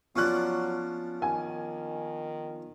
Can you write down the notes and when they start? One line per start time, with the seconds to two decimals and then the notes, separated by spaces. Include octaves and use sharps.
0.16 F3 F#3 B3 C#4 D4 C#6 F#6
1.22 D#3 G#5